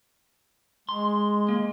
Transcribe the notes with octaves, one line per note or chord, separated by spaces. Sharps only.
G#3 C6
A#3